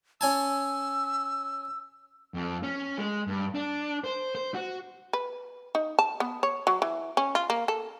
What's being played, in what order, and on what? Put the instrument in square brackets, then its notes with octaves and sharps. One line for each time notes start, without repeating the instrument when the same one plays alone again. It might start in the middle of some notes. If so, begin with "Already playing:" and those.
[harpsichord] C#4 G#5 A5 [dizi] E6
[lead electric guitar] F2
C#4
G#3
G2
D4
C5
C5
F#4
[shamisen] B4
D#4
A5
B3
C#5
F#3
E3
C#4
F4
A#3
A4